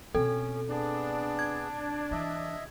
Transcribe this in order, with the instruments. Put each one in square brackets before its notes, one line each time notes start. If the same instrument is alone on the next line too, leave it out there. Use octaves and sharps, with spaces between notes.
[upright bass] B2 C4 [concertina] C#4 [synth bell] A4
[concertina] B3 G#4 [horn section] D4
[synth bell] G#6
[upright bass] E3 [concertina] D#5 E5